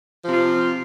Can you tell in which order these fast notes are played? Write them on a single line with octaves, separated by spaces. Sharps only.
F3 C3 F4